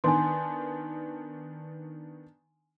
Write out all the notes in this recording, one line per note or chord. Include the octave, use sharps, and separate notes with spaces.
D#3 B3 D4 G#5 C6